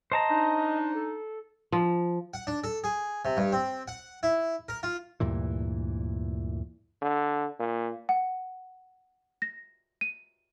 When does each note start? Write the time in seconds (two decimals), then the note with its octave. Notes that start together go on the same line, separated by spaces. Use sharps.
0.12 C5 D#5 A5 A#5
0.30 D4 D#4
0.94 A4
1.72 F3
2.34 F#5
2.47 D4
2.64 A4
2.84 G#4
3.25 C3
3.37 G2
3.52 C4
3.88 F#5
4.23 E4
4.69 A#4
4.83 F4
5.20 D2 G2 A#2 E3
7.02 D3
7.60 A#2
8.09 F#5
9.42 A#6
10.01 D#7